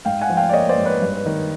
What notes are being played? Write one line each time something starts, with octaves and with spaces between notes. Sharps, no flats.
G#2 F5 G5
F#5 G#5
F3
F5 G5
D5
A#3 C#5 D#5
C5 D5
G#2
B4 C#5
G2
D#3